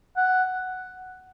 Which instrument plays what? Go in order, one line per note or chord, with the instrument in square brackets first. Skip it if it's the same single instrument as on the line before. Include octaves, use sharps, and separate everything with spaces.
[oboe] F#5